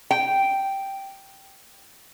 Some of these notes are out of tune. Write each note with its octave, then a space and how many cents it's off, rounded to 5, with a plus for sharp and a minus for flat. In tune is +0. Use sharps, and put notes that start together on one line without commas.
G5 -5